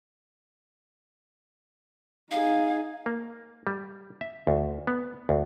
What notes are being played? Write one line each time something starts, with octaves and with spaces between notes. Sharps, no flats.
D#4 G#4 F5
A#3
G3
E5
D2
B3
D2